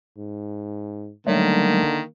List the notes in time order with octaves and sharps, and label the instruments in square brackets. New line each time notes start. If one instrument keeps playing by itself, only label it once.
[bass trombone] G#2
[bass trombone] D3 [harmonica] D#3 [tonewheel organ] F#3 G3 A3 [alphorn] A#3